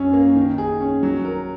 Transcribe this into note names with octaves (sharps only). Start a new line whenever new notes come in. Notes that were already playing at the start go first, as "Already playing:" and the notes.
Already playing: F#2 C#4
A#3
D#3
G#4
C#4
F#3
A#4